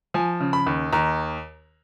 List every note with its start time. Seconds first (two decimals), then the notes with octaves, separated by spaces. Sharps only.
0.14 F3 G#5
0.40 C#3
0.53 B5
0.67 D#2
0.93 D#2 A#5